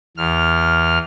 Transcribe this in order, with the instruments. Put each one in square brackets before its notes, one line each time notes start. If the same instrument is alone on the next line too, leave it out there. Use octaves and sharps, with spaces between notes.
[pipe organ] E2 F6